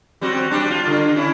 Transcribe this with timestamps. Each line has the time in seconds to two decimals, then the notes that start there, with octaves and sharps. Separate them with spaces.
0.21 G3 C4 F#4
0.51 G3 D4
0.71 F4
0.87 D3
1.16 C#4 E4